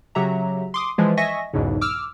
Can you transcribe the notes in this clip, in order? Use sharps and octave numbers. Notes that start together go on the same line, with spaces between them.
C#3 F#3 G4 E5 A#5
C6 D6 D#6
E3 F3 G#3
D#5 E5 G#5 C#6 A#6
B1 E2 G#2 C#3
D6 E6 F6